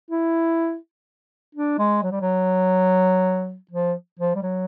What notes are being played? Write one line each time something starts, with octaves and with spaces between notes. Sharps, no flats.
E4
D4
G#3
F#3
G3
F#3
F3
F3
G3
F#3